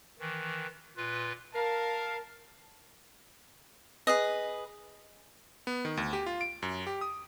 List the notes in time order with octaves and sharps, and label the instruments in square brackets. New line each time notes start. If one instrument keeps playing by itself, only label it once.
[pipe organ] D#3 E3
A#2 F4 B4
[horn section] A#4 [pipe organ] F5 [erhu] A5
[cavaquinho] G#4 B4 D#5
[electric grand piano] B3
D#3
D2
G4
F4
D7
F#2
G4
D#6